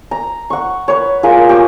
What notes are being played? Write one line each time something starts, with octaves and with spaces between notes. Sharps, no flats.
A#5
F#5 C#6
B4 C#5
F4 G#4 A#4
G4 G#5 C#6 D#6